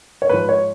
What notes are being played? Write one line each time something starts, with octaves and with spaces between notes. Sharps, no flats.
C#5
G#2 F3 B4
C#5